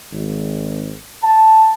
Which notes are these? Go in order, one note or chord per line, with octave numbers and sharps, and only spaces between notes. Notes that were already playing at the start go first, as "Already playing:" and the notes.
G#1
A5